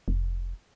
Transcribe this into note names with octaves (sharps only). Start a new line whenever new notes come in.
F1